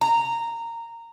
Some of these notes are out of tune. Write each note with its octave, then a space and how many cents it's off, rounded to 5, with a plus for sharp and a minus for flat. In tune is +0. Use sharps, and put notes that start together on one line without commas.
A#5 -10